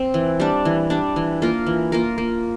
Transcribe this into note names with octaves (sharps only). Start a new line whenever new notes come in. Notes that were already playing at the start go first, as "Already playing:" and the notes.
Already playing: C4
E3
G3 D4
E3
G3 D4
E3
A#3 F4 A#4
E3
A#3 F4 A#4
A#3